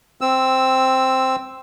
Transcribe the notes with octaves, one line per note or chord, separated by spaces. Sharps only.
C4 E6